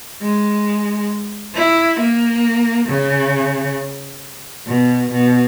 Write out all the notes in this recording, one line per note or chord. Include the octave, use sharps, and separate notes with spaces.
G#3
E4
A#3
C#3
B2
B2